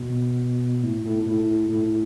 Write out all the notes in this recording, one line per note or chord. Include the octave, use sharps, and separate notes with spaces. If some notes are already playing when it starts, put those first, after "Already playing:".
Already playing: B2
A2
A2
A2
A2